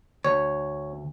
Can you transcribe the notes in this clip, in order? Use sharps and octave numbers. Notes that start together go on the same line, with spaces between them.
D2 C#5